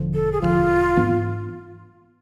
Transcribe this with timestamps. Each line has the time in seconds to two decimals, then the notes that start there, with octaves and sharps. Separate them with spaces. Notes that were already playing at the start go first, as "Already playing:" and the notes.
Already playing: E1 D3 F3
0.14 A4
0.32 G#4
0.41 E1 D2 D3 F3 F4
0.97 G#2 E3 B3 D4